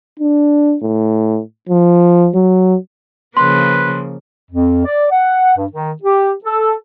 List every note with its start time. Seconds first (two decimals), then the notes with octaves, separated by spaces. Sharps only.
0.20 D4
0.83 A2
1.69 F3
2.35 F#3
3.37 C#3 F3 A#3 B4 C6
4.51 F2
4.85 D5
5.12 F#5
5.57 G2
5.72 D#3
6.03 G4
6.44 A4